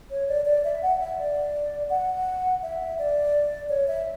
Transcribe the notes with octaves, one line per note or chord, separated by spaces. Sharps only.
C#5
D5
D5
E5
F#5
E5
D5
F#5
E5
D5
C#5
E5